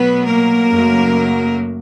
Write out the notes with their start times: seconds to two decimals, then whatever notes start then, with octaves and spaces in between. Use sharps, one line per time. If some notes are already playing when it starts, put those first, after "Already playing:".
Already playing: B2 F#3 A3 B3 B4
0.26 A#3 A#4
0.70 F#2 C#3 F#3 A3